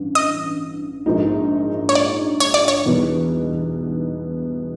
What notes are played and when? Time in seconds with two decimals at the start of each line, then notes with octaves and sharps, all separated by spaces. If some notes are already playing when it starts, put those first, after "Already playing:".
Already playing: A1 G2 E3
0.15 D#5
1.06 A#1 G#2 F3 A#3 D#4
1.89 C#5
1.95 D5
2.40 C#5
2.54 D5
2.68 C#5
2.85 E2 B2 G3 B3 D#4